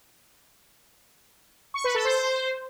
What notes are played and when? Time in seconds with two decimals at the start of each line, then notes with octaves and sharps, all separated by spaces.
1.74 C#6
1.84 B4
1.95 A4
2.05 C5